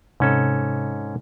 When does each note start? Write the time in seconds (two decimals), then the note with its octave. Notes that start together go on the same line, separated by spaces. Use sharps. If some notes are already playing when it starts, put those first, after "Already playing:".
0.20 G#2 C3 C#4 A4